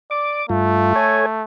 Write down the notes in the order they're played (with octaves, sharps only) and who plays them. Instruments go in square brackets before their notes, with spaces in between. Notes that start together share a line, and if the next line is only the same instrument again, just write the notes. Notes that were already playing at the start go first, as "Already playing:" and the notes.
[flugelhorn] D5 [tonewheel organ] D6
[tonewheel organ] G2 F4 [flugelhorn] A3
[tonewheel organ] A4 C#5 G#5